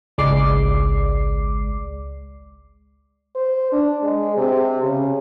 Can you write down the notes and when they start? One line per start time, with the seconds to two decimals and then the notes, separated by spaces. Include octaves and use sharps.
0.18 G#1 C#2 G#3 D5 D6 C7
3.35 C5
3.72 D4
4.03 G#3
4.37 C3
4.83 C#3